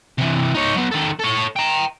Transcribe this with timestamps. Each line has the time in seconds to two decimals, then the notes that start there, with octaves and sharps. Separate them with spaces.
0.18 C3 E3
0.54 D#4 C#5
0.75 F#3 B3
0.91 D#3 A4
1.19 A4 C#5
1.56 G5 A#5